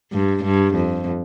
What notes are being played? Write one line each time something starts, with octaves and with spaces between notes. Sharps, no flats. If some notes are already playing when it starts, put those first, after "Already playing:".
G2
G2
F2